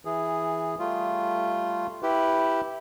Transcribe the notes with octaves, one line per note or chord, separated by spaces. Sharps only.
E3 G#4
G3 A3 F4
E4 G4 B4